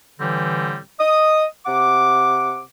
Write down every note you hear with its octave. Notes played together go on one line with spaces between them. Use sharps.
A2 D3 E3 G3 C4
D#5 D#6
C3 F#5 D6